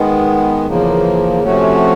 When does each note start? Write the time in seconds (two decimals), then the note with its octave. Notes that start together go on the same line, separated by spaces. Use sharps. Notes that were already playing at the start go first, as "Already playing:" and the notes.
Already playing: D#3 G#3 B3
0.66 E2 C#3 F3 A#3
1.42 C3 F3 A3 C#4 F#4